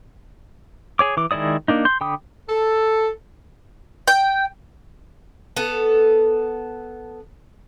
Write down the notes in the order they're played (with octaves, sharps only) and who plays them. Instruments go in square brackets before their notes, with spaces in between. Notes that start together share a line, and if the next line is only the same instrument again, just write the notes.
[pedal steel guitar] G#4 C#5 D6
E3 D6
D#3 G#3 E4 D5 D#6
A#3 D4 D#4
C6 G6
D3 G5 B5 D6 D#6
[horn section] A4
[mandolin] G5
[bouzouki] B3 A4